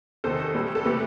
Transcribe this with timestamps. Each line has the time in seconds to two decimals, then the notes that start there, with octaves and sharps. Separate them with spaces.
0.24 E2 C3 D#3 A4 C5
0.54 A2 G3
0.75 A4
0.85 C3 E3 A3 G4 B4